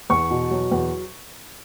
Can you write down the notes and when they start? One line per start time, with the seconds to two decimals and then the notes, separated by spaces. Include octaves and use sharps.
0.10 E2 C#6
0.31 B2
0.51 F#3
0.72 E2